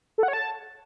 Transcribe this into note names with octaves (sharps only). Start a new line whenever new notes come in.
A4
F#5
C#5
A5